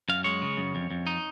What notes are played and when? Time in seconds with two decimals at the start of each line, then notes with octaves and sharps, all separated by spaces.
0.09 F#2 F5
0.24 G#3 C#5
0.42 C#3
0.57 F#2
0.75 F2
0.91 F2
1.07 D#4